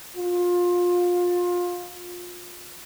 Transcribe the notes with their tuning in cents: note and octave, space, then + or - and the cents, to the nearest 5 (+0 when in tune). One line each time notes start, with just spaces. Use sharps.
F4 +25